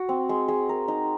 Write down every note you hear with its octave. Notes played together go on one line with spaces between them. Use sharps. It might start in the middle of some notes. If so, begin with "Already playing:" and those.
Already playing: F#4
C4
G#3
G#3
A#4
D#4